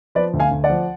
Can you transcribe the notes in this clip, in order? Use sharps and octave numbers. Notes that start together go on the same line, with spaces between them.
F3 B4 D5
D2
F5 G#5
D2
D5 F#5
F3